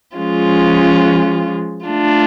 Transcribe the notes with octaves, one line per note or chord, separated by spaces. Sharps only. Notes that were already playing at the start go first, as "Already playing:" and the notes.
F3 G#3 C#4 F4
A3 D4 F4